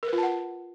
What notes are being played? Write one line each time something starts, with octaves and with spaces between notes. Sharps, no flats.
A#4
B4
F4
A5
F#5